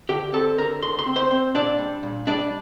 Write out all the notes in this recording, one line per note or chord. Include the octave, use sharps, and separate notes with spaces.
D3 G4 G5
C4 A4 A5
D3 A#4 A#5
D2 C6
C6
C4
C5 C6
C4
A#2 D4 D5
G3
A#2
G3 D4 D5